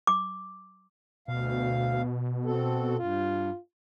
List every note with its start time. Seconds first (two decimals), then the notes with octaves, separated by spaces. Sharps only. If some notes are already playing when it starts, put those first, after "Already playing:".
0.07 D6
1.28 D2 B2 F5
2.45 C4 F#4 A4
2.99 G2 F4